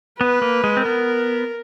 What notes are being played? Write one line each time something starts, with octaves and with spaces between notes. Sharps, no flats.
B3 B4
A#3
G#3
C4
B3 A#4